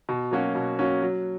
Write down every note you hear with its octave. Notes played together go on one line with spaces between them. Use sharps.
B2
F#3 A#3 C#4 F#4
B2
F#3 A#3 C#4 F#4
F#3